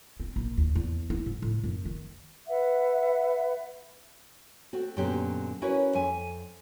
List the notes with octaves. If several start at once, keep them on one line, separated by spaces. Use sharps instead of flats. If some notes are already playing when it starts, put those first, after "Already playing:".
C4
A#1
D#2
E2
E4
G#2
A2
F#2
D#3
B4 E5 F#5
A3 C4 F#4
F#2 A#2 D3 B3 G4
C#4 E4 F#4 A#4 B4 C#5
F2 E5 G#5